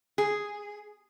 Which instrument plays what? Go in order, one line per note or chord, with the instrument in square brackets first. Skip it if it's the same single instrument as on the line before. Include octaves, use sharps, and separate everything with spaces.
[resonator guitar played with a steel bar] G#4